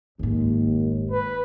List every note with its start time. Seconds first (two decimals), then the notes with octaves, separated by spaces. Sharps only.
0.19 F1 D#2 G#2
1.12 B4